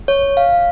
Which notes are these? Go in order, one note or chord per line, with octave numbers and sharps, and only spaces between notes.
C#5
F5